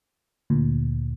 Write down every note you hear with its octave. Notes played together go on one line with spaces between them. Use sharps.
D2 A#2